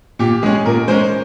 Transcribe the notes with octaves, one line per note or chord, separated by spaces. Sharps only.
A#2 G4
G#3 C#4 G#4
A#2 A#4
G#3 C#4 C5